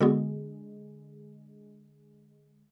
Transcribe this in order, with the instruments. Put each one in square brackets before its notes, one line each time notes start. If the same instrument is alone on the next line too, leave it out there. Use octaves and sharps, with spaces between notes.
[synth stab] D3 G#3 [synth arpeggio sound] B3 F#4 A4